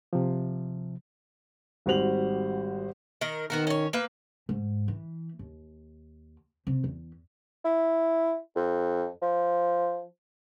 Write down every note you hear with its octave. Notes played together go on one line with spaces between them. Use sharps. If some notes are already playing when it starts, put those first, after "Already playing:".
C3 F3
G#1 G3 F#4 C5 F7 F#7
D#3 A#4
D#3 B3 F#4 A#4
C#4 C#5
A#3 B4 F5
G#2
E3
D#2
C3
E2
E4
F2
F3